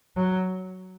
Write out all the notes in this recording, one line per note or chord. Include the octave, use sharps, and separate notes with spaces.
F#3